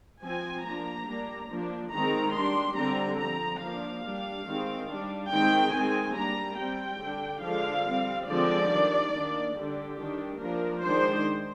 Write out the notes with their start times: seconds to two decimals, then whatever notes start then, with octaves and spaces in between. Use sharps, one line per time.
0.23 F3 C4 G#5
0.65 F3 A#3 D4 A#5
1.07 G3 A#3 D4
1.50 F3 A#3 D4
1.92 D#3 G#3 C4 A#5
2.35 G3 D4 C6
2.77 D3 G3 C4 A#5
3.19 F3 C4 A#5
3.62 F3 A#3 D4 F5
4.04 G3 D4
4.46 D#3 G#3 C4
4.89 G3 D4
5.31 D#3 G#3 C4 G5
5.73 D#3 G#3 C4 G#5
6.16 G3 A#3 D4 A#5
6.58 G3 C4 G5
7.01 D3 G3 D4
7.43 D3 F3 G#3 D4 F5
7.86 G3 C4
8.28 D3 F3 G#3 C4 D5
8.70 D#3 G3 D4
9.12 D#3 A#3 D4
9.55 D3 G3 D4 G4
9.97 D#3 G3 D4
10.40 F3 A#3 D4 A#4
10.82 D#3 G#3 D4 C5